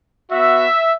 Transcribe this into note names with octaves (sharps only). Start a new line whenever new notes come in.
B3 F#4 E5